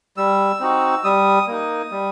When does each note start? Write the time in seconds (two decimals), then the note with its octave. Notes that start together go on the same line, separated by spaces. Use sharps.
0.17 G3 E6
0.60 C4 D#4 F#4
1.04 G3 D#6
1.48 A#3 D#4
1.91 G3